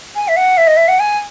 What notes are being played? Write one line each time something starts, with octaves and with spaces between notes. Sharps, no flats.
G#5
E5
F#5
E5
D#5
E5
F#5
G#5